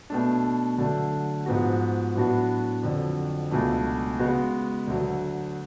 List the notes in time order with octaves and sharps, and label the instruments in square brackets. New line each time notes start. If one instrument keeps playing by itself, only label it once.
[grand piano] B2 A3 D4
D3 F#3 A3 D4
G#2 F3 B3 F#4
A2 F#3 B3 D4 F#4
F2 D3 F#3
C#2 B2 F#3 A3 D4
C#3 G#3 B3 F#4
D2 D3 F#3